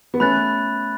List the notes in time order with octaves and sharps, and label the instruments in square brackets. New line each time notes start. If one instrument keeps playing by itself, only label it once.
[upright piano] B3
[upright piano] A3 C#4 [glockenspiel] B5 F#6 A6